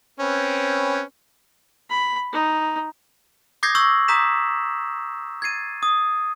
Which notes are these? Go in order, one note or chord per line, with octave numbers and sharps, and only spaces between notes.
C4 C#4 B4
B5
D#4
D6 D#6 G6 G#6 A#6 C7
C#6 E6 G6 A#6 F#7
A#5 D#6 G6 B6 E7
G#6 A6 C7 D#7
D#6